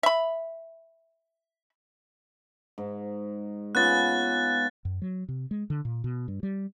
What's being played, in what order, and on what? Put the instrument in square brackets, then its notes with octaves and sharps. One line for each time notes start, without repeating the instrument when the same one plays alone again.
[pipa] E5 B5
[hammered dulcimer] G#2
[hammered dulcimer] B3 C#4 F4 [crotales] F#6 A6
[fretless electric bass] F#2
F#3
C3
G#3
D3
A#2
B2
G2
G3